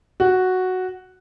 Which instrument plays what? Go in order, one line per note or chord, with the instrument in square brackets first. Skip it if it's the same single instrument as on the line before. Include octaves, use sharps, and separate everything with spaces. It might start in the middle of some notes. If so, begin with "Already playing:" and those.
[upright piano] F#4